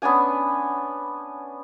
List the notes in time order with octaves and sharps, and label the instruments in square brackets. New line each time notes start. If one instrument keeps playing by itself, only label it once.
[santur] B3 C#4 D4 G#5